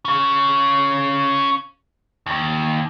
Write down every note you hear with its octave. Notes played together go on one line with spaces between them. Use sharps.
C#4 F5
D#2